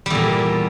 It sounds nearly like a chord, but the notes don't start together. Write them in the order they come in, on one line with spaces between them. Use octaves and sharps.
G3 E2 A#2